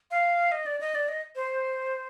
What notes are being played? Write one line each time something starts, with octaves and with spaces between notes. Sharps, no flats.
F5
D#5
D5
D#5
D5
D#5
C5